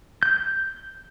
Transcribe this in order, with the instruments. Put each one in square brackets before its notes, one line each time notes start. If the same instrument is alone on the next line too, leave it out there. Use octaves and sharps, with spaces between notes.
[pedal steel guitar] G6